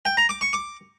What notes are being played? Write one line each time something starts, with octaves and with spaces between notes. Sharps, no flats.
G5
A#5
D6
C#6
D6